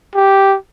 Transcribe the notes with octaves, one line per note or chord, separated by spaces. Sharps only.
G4